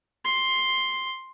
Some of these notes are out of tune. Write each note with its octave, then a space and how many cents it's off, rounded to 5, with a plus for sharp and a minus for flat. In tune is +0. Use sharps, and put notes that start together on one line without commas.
C6 +5